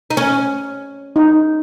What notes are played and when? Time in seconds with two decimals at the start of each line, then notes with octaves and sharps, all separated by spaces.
0.10 D#4
0.17 C#4
1.16 D#4